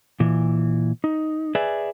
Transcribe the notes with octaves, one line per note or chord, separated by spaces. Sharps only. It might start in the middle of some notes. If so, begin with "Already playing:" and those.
A#2 E3
D#4
G#4 B4 D5 E5 G#5